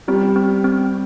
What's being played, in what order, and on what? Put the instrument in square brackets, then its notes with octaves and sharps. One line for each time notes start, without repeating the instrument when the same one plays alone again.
[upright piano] G3 [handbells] C4
[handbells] C4
C4